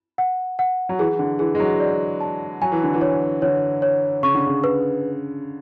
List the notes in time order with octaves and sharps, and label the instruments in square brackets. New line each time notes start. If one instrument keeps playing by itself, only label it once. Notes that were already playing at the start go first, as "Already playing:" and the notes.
[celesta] F#5
F#5
[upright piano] F#3
[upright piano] E3 [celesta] G#4
[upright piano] D3
[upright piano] E3 [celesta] G#4
[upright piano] G#3
F#3
[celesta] D5
A5
[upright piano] F#3 [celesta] G#5
[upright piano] E3
D3
E3
[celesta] C#5
[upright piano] D3 [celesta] C#5
[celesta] C#5
[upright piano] C#3 [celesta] C#6
[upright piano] D3
C#3
[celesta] B4